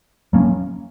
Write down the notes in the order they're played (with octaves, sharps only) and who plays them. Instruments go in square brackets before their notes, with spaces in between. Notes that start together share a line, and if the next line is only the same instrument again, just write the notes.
[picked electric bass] F#3 A#3 C#4